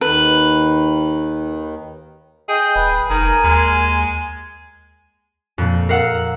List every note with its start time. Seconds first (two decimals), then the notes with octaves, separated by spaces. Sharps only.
0.01 D#2 D#3 B4
2.49 G#4 D#5 G5
2.76 D#1 B4
3.10 F1 D#3 A#4 G#5
3.44 D#2 G#3
5.58 F2 A#2
5.89 A#4 F5 F#5 E6